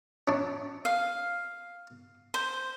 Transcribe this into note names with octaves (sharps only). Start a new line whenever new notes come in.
C#4 D4
F5
C5